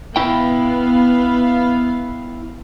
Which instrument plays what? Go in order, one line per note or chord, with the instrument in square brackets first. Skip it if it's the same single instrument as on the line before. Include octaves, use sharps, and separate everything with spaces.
[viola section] B3 F5 [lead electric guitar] E4 G5